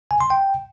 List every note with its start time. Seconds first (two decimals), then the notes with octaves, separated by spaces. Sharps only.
0.11 G#5
0.21 C6
0.30 G5